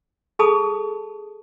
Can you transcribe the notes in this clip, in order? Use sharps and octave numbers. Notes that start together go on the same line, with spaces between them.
G#4 A4 A5 B5 D#6